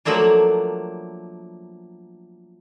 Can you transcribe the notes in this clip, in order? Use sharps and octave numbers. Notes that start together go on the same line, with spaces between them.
F3 F#3 A3 A#3 D4